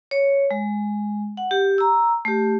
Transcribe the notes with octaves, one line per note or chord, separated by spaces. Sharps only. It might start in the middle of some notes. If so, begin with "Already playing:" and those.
C#5
G#3
F#5
G4
A#5 E6
A3 G4